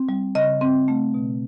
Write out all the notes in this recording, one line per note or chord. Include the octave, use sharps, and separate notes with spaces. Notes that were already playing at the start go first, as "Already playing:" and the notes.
Already playing: C4
G3
C#3 D#5
C4
A3
B2